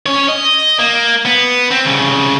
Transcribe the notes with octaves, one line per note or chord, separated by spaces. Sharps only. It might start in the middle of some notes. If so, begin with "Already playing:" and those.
C#4 C#5
D#5
A#3
B3
C4
C2 C#3